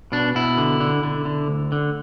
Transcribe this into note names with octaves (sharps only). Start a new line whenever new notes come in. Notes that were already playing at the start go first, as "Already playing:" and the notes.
B2 D4
B2 E4
D3
D3
D3
D3
D2
D3